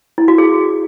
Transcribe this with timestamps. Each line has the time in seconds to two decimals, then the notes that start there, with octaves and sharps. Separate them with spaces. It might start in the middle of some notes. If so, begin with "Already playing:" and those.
0.18 E4
0.28 F#4
0.38 G#4